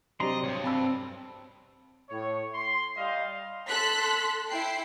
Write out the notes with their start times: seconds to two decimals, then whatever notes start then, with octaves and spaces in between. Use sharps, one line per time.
0.20 C3 F#3 C4 D5 D#5 A#5 C6
0.44 D2 G2 C#5
0.64 C4 A5 B5 E6
2.09 A2 C#5
2.54 C6
2.97 G3 D5 D#5 F5 G5
3.69 A4 C6 F#6 B6
4.49 E4 G5 C7